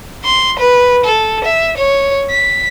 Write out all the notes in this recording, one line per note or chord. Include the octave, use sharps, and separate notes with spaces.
C6
B4
A4
E5
C#5
B6